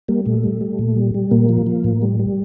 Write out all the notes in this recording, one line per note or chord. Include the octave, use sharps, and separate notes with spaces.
G3 A#3
A#2 A3
G3
G3
A#2
G3
G3
A#2 A#3
F3
F3
A2
G3
G3